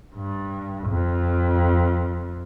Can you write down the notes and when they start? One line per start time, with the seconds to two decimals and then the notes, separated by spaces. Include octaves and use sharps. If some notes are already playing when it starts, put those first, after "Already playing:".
0.15 G2
0.89 F2